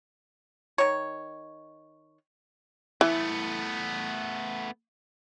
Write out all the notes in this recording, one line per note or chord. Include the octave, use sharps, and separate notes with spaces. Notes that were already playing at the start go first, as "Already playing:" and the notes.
D#3 C#5
E3 A3 B3